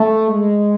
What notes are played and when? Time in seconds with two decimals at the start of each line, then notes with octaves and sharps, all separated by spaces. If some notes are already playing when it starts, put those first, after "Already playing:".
Already playing: A3
0.31 G#3